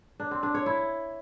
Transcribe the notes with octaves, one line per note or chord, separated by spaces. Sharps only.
D4
C4
D4
C#5
E4